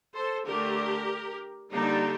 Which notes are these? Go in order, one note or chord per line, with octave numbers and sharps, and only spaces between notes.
A4 C5
D3 A3 D4 G4 A#4
D3 G3 A#3 D4 D#4 G4